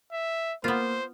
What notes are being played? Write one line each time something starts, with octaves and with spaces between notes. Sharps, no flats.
E5
A#3 B3 F4 C5